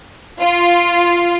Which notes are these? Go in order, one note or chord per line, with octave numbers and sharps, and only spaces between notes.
F4